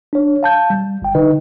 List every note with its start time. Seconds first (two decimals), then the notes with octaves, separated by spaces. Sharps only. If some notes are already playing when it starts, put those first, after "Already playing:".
0.13 D4 C#5
0.43 F5 A5 G6
0.70 G3
1.02 G1 G5
1.15 D3 D#4 B4 D#5